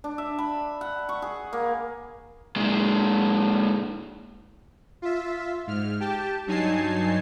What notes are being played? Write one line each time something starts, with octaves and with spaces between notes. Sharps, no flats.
D4
E5
B5
F#5
C#6
G#4
A#3
A#2 G#3
F4 E5
G#2 F6
G4 G5 A5
G2 F#3 D#4 G#5 A5 C7